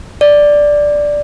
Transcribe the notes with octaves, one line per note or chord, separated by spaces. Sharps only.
D5